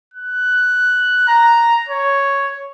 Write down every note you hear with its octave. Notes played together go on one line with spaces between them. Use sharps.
F#6
A#5
C#5